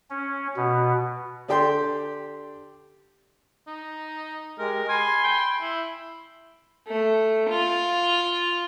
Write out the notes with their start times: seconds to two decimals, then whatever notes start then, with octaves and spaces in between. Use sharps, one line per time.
0.10 C#4
0.56 B2
1.48 D3 D4 G4 G5 C6
3.67 D#4
4.59 G#3 G4 A#4
4.89 G#5 B5 C6
5.24 G5
5.61 E4
6.88 A3
7.49 F4